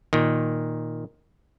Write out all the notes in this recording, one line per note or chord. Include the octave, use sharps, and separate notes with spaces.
A#2 D#3